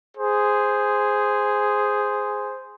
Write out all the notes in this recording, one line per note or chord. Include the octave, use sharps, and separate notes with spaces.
G#4 C5